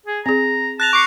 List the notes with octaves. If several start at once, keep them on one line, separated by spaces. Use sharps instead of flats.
G#4
C4 G#4 A#5
A5 F#6 A#6 F7
C#6 D6 C7 C#7